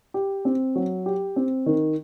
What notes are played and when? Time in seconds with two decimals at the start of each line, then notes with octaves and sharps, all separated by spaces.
0.14 G4
0.45 C4
0.75 F#3
1.06 G4
1.36 C4
1.66 D#3